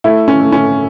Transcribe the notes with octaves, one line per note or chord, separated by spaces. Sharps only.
A3 E4
C#4
A3
C#4